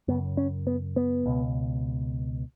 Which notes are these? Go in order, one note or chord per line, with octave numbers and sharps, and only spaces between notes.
F#2 C#3 B3
C#4
B3
B3
C#2 B2